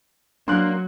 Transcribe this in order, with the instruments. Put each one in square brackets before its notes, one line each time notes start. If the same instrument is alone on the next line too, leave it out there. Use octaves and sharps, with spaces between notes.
[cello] F#3 [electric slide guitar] A#3 [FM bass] D4 [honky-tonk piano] C6 F#6